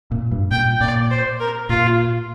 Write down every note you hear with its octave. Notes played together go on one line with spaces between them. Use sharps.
A#2
G2
A#2 G5
A#2 D5
C5
A#4
A#2 F4